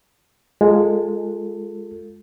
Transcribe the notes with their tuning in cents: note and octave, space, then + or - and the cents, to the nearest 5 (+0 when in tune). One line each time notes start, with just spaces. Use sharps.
G#3 +0 F4 +0 A4 +25